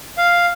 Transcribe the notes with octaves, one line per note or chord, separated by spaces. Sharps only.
F5